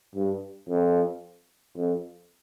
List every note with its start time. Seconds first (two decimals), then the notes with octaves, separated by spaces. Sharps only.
0.15 G2
0.68 F2
1.76 F2